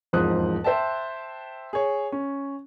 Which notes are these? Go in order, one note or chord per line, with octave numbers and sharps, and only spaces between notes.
E1 F2 G#2 F3 D#6 F#6
C5 E5 G5 A5
G#4 C#5
C#4